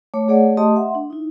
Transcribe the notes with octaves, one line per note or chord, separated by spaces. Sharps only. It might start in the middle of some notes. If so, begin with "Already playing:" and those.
A3 C#5 D6
A3 G#4 C#5 D5 F#5
A3 G4 D#5 A5 C6 D#6
E5 F#5 C6
D4
D#4 E4